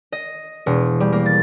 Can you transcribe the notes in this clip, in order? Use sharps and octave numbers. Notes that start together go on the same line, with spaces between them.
D#5
E1
G3
A#3
A6